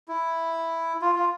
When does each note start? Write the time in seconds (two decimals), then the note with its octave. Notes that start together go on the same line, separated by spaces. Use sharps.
0.08 E4
1.02 F4
1.15 F4